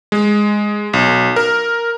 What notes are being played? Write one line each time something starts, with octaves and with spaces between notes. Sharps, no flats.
G#3
B1
A#4